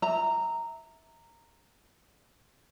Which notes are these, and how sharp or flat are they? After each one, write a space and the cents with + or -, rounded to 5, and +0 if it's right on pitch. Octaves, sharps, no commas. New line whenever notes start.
E5 -20 A#5 -10